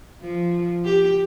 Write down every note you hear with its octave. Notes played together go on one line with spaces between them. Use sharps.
F3
G4